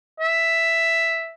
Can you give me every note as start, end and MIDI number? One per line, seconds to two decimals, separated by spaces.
0.20 1.34 76